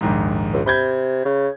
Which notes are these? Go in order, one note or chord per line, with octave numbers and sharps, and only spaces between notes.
A#1 D#2 G#2
C#2
C3 B5 G6 G#6
C#3